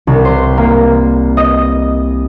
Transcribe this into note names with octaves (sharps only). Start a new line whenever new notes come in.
C2
C5
A#3
D#5